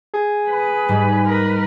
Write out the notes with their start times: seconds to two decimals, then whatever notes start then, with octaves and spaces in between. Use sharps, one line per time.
0.14 G#4
0.49 B4
0.89 G#2 G3
1.26 A#4 B4